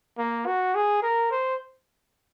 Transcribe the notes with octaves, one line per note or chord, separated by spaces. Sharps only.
A#3
F#4
G#4
A#4
C5